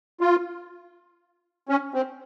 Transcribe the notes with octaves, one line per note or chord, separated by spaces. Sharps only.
F4
C#4
C4